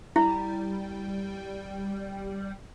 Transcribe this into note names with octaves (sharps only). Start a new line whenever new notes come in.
G3 E4